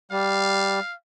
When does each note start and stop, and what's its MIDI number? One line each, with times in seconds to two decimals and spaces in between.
0.11 0.80 55
0.11 0.94 77